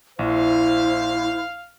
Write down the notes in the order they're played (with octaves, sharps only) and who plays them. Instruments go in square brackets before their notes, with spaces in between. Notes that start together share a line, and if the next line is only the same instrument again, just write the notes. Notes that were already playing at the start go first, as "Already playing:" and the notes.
[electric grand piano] A#1 [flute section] E4 C5 [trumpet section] F5